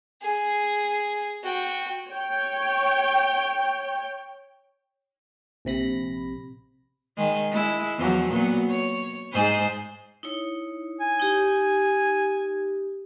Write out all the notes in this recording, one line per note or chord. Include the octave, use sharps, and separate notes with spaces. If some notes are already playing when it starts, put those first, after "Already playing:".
G#4
F#4 G5
C#5 G5
A#1 C3 B5 A#6
D#3 G#3
G#3 E4
E2 F3 F#3
A#2 F#3 B3
C#5
G#2 G#4 C5
D#4 E4 C#5
G#5
D#4 G4